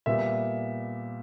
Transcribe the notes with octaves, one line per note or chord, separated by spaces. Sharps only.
A#2 G3 B3 E5